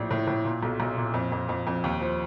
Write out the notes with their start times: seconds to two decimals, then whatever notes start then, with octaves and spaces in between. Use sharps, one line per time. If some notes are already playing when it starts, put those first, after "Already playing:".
Already playing: A#1 A2
0.11 A2
0.27 A2
0.45 A#2
0.63 B1
0.80 B1
0.97 A#2
1.14 F2
1.32 F2
1.49 F2
1.67 F2
1.84 D#2
2.01 F3